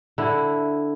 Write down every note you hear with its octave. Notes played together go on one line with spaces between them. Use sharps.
D3 E4